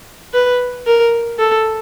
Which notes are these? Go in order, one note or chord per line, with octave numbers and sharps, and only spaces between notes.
B4
A#4
A4